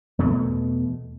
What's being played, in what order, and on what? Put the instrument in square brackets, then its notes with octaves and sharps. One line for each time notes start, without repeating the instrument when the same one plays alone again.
[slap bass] E2 B2 A3